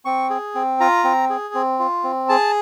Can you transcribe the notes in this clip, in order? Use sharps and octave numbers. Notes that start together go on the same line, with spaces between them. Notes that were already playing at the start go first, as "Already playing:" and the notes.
C4 C#6
G#4
C4
F4 A#5
C4
G#4
C4
F4
C4
G#4 A5